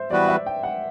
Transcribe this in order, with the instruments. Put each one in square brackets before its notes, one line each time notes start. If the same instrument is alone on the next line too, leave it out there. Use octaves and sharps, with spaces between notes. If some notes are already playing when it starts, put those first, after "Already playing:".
Already playing: [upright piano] C5 E5
[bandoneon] E3 G3 B3 F#4 B4 [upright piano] D5
[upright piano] E5
G5
F#5